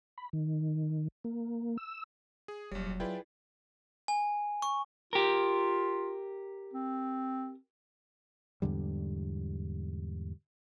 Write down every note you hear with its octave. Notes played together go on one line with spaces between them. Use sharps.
B5
D#3
A#3
E6
G#4
F1 A#1 F#3 G3 C#5
E4 F4 G#4 B4 D5 G5
G#5
C#6
F4 G4 A#4
C4
E2 G#2 D3 G3